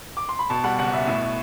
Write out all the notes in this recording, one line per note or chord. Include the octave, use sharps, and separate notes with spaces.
D6
C6
B5
B2 A5
G3 F#5
F#1 F#5
B2 E5
A2 E5